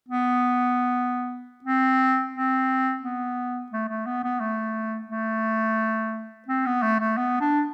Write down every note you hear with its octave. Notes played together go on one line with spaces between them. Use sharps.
B3
C4
C4
B3
A3
A3
B3
B3
A3
A3
C4
B3
A3
A3
B3
D4